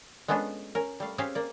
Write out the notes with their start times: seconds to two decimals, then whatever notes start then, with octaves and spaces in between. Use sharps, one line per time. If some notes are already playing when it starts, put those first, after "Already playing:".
0.28 G#3 A3 B3 C#4 D4 F4
0.75 C#4 A#4
1.00 G3 A3 F5
1.18 C4 C#4 G4 G#4 E5 F5
1.35 A#3 D5